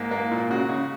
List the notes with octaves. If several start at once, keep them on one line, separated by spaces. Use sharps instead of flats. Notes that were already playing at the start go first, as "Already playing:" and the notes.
Already playing: G#2 A#3
A#3
A#2
C#3 F#4
C#3